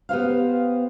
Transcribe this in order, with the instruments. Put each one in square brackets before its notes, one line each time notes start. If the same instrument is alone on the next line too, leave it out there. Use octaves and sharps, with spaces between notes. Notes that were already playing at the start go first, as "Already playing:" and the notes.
[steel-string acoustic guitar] B3 G4 C5 F5